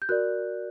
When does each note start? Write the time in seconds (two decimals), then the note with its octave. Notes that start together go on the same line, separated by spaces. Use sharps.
0.02 G6
0.09 F#4 A#4 D5 F#6